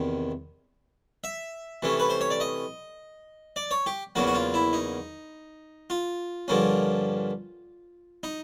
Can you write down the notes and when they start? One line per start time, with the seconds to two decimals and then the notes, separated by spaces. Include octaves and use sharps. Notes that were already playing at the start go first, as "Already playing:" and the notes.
Already playing: E2 C3 D#3
1.24 E5
1.82 C3 E3 A3 C#4
2.00 B4
2.10 C5
2.21 C#5
2.30 D5
2.40 D#5
3.56 D5
3.71 C#5
3.86 G4
4.15 E2 C#3 F#3 A#3 F#4
4.27 F#4
4.35 F4
4.54 E4
4.73 D#4
5.90 F4
6.48 G2 D3 F3 A#3 C#4
8.23 D#4